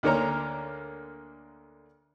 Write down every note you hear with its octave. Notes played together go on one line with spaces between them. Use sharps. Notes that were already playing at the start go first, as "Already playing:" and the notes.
D2 D3 A#3 C#5 A#5